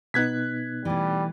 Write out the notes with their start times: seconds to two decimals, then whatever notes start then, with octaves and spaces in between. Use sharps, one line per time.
0.14 B2 B3 D#4 F#6 G#6 B6
0.85 E3 G3 A3